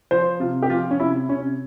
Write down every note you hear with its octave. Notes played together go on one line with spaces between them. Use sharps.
F3 C5
C3 F4
G4
F3 F4
C#4
C3 E4
C3 C#4